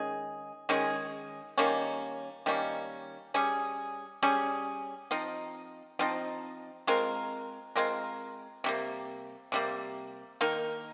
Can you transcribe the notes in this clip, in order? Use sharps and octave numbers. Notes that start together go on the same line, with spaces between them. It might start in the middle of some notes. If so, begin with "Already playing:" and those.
Already playing: D#3 G#3 C#4 G#4
D#3 G#3 C#4 G#4
D#3 G3 A#3 C#4
D#3 G3 A#3 C#4
G3 C#4 G#4
G3 C#4 G#4
F3 C4 D#4
F3 C4 D#4
G#3 C4 F4 A#4
G#3 C4 F4 A#4
C3 G3 A#3
C3 G3 A#3
D#3 A#3 D#4 A#4